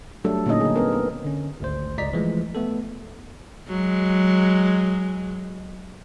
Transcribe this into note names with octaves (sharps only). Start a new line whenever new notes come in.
F#3 G3 A3 D4 A4
A#2 D3 A#3 C#4 D#4 D#5
D3 G#4
B3 C4 A#4
B3
D3 C#4
G#1 D2 C5
G1 C#2 D5 D#5 A#5 B6
E3 F3 G#3 A3
A3 B3 A4
F#3 G#3